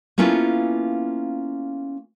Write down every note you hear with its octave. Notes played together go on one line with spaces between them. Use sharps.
A#3 B3 C#4 E4 F4 A4